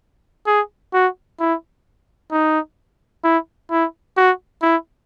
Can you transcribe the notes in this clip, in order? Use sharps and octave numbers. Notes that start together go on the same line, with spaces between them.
G#4
F#4
E4
D#4
E4
E4
F#4
E4